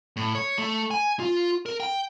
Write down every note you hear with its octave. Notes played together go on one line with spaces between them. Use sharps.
A2
C#5
A3
G#5
F4
A#4
G5